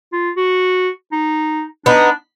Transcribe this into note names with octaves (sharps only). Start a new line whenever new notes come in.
F4
F#4
D#4
B3 D4 D#4